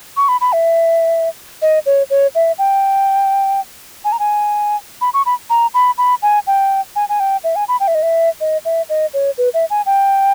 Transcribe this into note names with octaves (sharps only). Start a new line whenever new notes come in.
C#6
B5
B5
E5
D#5
C#5
C#5
E5
G5
G#5
A#5
G#5
B5
C#6
B5
A#5
B5
B5
G#5
G5
G#5
G#5
G5
E5
G#5
B5
G5
E5
D#5
E5
D#5
E5
D#5
C#5
B4
E5
G#5
G5